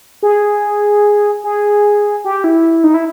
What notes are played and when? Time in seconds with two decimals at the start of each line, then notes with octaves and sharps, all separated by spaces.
0.23 G#4
1.44 G#4
2.24 G4
2.44 E4
2.84 D#4
2.94 E4